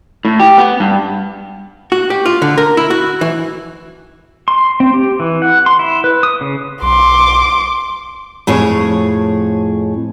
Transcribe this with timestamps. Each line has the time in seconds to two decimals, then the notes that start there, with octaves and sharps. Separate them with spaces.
0.25 A2
0.40 G4
0.58 B3
0.80 G2
1.92 F#4
2.10 G4
2.26 F4
2.42 D3
2.58 A#4
2.77 E4
2.90 F#4
3.21 E3
4.48 C6
4.80 C4
4.94 G4
5.20 E3
5.42 F#5
5.66 C6
5.79 E4
6.04 B4
6.23 D#6
6.41 C#3
6.82 B1 C6 D6
8.47 F2 A2 G#4 C#5